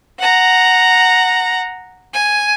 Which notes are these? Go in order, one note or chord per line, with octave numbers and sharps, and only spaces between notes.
F#5 A#5
G#5